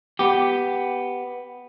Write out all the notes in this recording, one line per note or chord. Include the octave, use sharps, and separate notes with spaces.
B3 G4